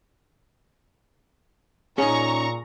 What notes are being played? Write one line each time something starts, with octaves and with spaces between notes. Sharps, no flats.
A#2 C#4 D#4 G#4 A#5 C#6